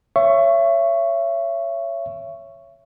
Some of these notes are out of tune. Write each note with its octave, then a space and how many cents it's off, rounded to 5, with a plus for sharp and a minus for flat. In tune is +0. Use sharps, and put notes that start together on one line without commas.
C#5 +0 E5 +30 C#6 +0